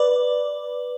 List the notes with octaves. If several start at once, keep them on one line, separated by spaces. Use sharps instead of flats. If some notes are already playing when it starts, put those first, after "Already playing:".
Already playing: B4 D5